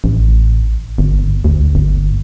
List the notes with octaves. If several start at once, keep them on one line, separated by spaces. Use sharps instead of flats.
A1
G1
D2
G1